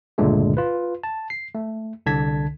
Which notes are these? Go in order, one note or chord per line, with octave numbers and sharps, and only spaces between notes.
C#2 G2 A#2 D3 G#3 A3
F4 B4
A5
C7
A3
C2 D3 A5 G#6 B6